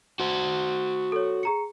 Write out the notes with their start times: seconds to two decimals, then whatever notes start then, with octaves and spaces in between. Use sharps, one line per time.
0.20 F#4 C5
1.12 A4 C#5
1.43 G#4 A#5 C#7